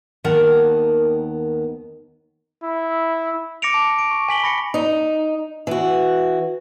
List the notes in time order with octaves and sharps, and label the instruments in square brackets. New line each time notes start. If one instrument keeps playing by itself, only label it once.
[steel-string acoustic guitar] D#2 D#3 B3 A#4 F#5 A5
[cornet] E4
[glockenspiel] D6 A#6 C#7 D7 F7
A5
D7
C#6
G#5 B6 F#7 G7
B5 A#6 C#7
[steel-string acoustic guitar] D#4
E3 F#4